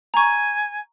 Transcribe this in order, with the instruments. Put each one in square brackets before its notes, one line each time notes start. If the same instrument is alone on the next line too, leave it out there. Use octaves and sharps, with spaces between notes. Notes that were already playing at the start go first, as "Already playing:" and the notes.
[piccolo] G#5 [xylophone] A#5 C#6